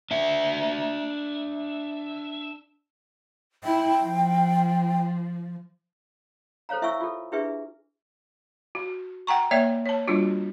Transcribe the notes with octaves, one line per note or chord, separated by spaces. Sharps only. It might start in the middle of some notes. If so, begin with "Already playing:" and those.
D4 E5
E4 G5
F3
A4 C5 C#5 F5 A#5
E4 E5 F5 G#5 C#6 E6
F4 A4
D4 E4 G4 G#4 B4 E5
F#4
F#5 G5 A#5 C#6
A#3 C#5 D5 E5 G5
C#5 A5
G3 D4 F4 F#4